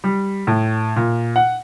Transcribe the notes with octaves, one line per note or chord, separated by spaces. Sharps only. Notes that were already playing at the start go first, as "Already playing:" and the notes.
G3
A2
A#2
F#5